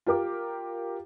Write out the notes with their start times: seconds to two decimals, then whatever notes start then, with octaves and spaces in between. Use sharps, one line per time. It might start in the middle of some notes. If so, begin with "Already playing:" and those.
0.06 F4 G4 A#4 D6